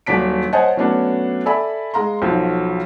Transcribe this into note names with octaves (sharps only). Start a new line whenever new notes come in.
D#1 F#3 D4 B6 D7
C5 C#5 D#5 F#5 G#5 A5
F#3 A3 B3 C#4 D4
A4 D5 E5 G#5 B5
G#3 F5 A#5 C6
B1 F3 F#3